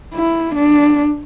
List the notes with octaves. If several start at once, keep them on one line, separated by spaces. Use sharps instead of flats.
E4
D4